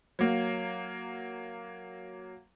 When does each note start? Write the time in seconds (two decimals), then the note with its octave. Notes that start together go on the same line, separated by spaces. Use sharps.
0.19 F#3 A#3